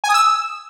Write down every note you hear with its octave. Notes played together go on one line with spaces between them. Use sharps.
G#5
D#6
E6